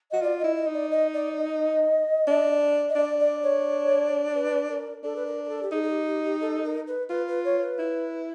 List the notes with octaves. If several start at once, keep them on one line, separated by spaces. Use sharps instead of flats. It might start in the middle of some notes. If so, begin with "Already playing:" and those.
F#4 D#5
F4 D5
D#5
E4
D#5
D#4
D5
D#5
D5
D#5
D4
D#5
D4 D5
D5
C#5
B4
A#4
D4 A4
B4
A#4
A#4
A4
G4
D#4 G#4
G#4
G4
G4
G4
A4
A#4
B4
F4 B4
B4
C#5
B4
E4